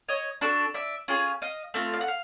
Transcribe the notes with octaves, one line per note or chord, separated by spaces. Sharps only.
C#5 D#5
D4 F#4 A4
D5 E5
C#4 F4 G#4
D#5 F5
A3 C4 F4
F5
F#5
F5